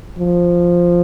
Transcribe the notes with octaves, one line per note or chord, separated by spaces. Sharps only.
F3